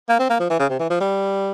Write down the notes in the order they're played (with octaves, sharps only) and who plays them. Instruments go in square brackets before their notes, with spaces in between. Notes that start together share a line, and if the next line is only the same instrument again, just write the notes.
[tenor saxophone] A#3
C4
A#3
F3
E3
C#3
C3
E3
F3
G3